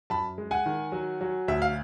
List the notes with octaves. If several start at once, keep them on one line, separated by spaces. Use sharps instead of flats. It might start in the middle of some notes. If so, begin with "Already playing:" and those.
F#2 A5 B5
G#3
F#5 G#5
D#3
F#3
F#3
D2 E5
F5